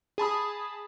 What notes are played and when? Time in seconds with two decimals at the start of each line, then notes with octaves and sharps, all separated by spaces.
0.18 G#4 A5 B5 D#6